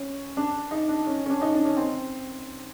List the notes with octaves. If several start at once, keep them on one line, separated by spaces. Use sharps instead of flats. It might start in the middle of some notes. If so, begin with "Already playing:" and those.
Already playing: C#4
D4
D#4
D4
C#4
C#4
D4
D#4
D4
C#4
C4